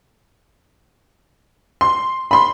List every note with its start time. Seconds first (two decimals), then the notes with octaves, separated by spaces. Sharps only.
1.81 C6
2.31 B5 C6